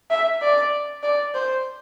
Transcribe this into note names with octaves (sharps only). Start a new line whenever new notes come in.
E5
D5
D5
C5